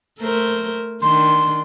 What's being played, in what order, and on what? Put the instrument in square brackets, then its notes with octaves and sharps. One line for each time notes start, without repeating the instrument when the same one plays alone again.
[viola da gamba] A3 A#4 C5
[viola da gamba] D#3 D4 [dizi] C6